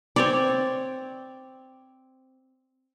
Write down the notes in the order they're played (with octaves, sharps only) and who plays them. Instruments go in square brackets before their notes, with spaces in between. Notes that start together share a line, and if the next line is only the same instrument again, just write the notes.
[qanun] C4 C#5 D5